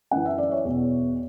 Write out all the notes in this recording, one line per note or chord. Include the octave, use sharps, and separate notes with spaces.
F#2 E3 F#5
E5
D5
C#5
E2 B2